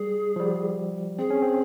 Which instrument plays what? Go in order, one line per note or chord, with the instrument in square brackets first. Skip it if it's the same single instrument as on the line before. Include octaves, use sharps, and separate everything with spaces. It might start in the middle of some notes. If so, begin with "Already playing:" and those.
Already playing: [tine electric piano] G3 [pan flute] G#4
[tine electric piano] F3
G3
[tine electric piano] C4 [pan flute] G#4
[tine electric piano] C#4
C4